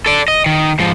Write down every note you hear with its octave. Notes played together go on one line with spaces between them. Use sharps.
A4 D5
D#5
D#3
G#2 F3